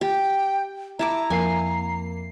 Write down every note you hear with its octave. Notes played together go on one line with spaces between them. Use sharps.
G4 G5
E4 A5 A#5 D6
F2 A#3 G#5 C7